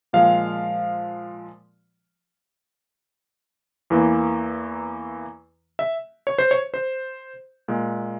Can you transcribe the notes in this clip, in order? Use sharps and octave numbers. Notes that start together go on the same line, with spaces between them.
A#2 F3 G#3 F5
E2 E3 A#3
E5
C#5
C5
C#5
C5
A#2 G#3